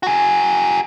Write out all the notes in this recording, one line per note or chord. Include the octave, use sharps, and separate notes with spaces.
F#4 G#4